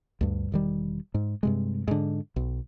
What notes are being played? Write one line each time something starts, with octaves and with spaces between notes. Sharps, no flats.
D2 G2
E1 D#3 G3
G#2
G2 C3 G#3
G#2 D3
B1